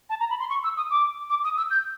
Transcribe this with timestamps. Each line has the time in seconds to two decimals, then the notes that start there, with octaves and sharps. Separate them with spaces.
0.10 A5
0.20 A#5
0.30 B5
0.40 C6
0.50 C#6
0.64 E6
0.77 D#6
0.90 D6
1.30 D6
1.44 D#6
1.57 E6
1.70 G6